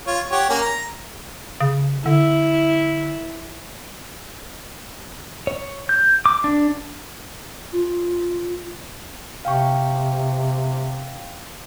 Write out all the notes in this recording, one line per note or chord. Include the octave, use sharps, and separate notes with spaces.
F4 C#5
G4 C#5 F#5
A#3 C#4 G#5
A#5
C#3
D3 E4
C#5
G6
D6
D4
F4
C3 F5 G5 C#6